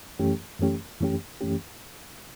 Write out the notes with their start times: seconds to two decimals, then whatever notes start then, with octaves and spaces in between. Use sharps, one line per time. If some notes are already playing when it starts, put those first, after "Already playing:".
0.19 F#2 E3 A3 C#4 G4
0.59 F#2 E3 A3 C#4 G4
1.01 F#2 E3 A3 C#4 G4
1.41 F#2 E3 A3 C#4 G4